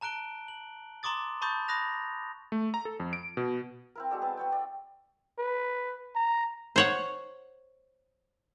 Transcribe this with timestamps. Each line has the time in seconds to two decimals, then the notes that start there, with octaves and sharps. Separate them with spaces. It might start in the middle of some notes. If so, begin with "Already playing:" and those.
0.01 A5 A#5 F#6 D7 G7
0.48 F#7
1.03 A#5 C6 D6 D#6 A6
1.42 A5 B5 C#6 D#6 G6 A6
1.68 B5 D#6 F#6 A#6 F7
2.52 A3
2.74 A#5
2.85 A4
3.00 F2
3.13 D7
3.37 B2
3.95 C4 E4 A#4
4.11 G#3 F#4 A4 D5
4.22 B3 A5
4.37 B3 C#5 G5
4.52 D5
5.39 B4
6.15 A#5
6.76 C5 C#5 F#5